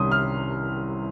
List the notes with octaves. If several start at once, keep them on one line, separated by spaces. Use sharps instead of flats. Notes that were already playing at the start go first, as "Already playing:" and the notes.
Already playing: C2 C3 D#3 G3 C#4 C6 D#6
F6